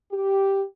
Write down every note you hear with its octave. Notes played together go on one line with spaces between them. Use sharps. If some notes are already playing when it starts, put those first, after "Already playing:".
G4